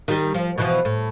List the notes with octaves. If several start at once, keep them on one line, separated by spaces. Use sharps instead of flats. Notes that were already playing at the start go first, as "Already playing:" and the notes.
D#3 G3 G4
F3
B2 E3 F3
A2